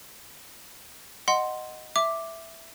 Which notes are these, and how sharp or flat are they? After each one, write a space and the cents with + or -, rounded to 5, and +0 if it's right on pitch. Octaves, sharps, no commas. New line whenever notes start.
D#5 -5 F#5 +0 C6 +0
E5 +0 D6 +0